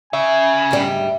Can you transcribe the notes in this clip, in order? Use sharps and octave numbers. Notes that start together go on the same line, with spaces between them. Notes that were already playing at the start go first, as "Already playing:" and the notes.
C#3 E5 G#5
D2 G#2 G3